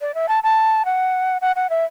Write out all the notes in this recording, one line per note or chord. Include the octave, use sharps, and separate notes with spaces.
D5
E5
A5
A5
F#5
F#5
F#5
E5